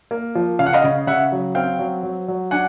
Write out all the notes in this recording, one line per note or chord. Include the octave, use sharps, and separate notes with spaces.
A#3
F3
C#3 F5
F#5
D#5 F5
C#3
C#3 E5 F#5
F#3
C4 F5 G5
F#3
F#3
F#3
D4 F#5 G#5